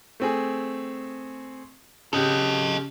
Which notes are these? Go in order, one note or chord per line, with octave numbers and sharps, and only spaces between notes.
A3 C4 G#4
C#3 G4 A4 D#5